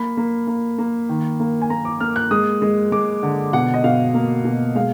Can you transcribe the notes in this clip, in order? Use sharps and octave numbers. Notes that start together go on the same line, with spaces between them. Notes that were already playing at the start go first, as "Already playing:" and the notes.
Already playing: A#3 B5
A#3
A#3
A#3
D#3
A#3
G#5
A#3 A#5
D6
A#3 F6
F#6
G#3 D#6
G#3
G#3 D6
D3
B2 F#5
D#5
B2 F5
A#3
B2
G#3 F5